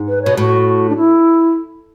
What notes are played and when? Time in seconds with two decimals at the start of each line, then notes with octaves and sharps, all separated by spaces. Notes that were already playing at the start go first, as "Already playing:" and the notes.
Already playing: G#2
0.08 B4
0.22 B2 C#5
0.37 A2 F#4
0.90 D4
0.97 E4